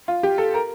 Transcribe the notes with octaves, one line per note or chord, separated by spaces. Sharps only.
F4
G4
A4
A#4